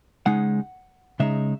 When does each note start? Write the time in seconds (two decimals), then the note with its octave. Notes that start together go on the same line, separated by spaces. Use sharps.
0.26 C#3 G#3 D#4 F#5
1.20 C#3 G#3 D#4 E5